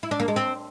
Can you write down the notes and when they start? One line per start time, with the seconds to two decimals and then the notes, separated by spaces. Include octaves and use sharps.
0.03 E4
0.11 D4
0.20 A#3
0.28 G#3
0.36 C4